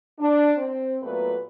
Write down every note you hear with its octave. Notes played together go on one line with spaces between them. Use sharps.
D4
C4
A#2 F#3 A3 B3 B4